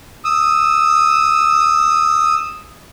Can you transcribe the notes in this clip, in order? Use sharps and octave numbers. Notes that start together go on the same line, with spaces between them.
D#6 E6